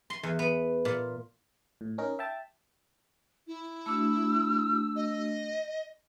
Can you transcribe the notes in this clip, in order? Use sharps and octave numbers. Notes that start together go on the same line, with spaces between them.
C6
E2
B3
A#2
A2
C#4 D#4 A#4
E5 G5 A5
E4
A3 D4 F#4 E6
D#5